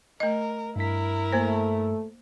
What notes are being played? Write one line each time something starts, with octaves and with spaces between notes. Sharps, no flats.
A3 A#4 D#5
G2 E4 A#4 B6
A3 A#3 C5